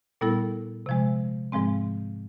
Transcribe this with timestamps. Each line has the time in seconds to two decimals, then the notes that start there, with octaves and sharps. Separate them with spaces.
0.21 A#2 G3 B3 E4 A4
0.86 C3 F3 G#3
1.52 G#2 F3 G#3 C4